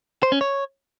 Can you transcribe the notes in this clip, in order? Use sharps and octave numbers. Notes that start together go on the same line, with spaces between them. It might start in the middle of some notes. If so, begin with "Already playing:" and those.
C5
C#4
C#5